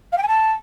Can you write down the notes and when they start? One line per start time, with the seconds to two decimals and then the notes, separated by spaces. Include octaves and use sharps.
0.12 F5
0.17 G5
0.22 G#5
0.28 A5